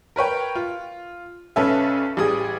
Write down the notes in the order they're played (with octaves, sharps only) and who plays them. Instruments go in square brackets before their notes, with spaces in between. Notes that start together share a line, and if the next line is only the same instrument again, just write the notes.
[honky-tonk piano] A#4 B4 C#5 G5
F4
B1 C#4 A4 B4 E5
A1 G3 G#4 D#6